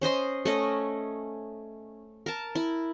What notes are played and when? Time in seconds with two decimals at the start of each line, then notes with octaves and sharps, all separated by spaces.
0.01 C#4 C5 D#5 C6
0.45 A3 C#4 D#5
2.26 A#4 A5
2.55 E4